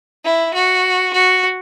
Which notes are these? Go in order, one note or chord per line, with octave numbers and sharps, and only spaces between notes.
E4
F#4
F#4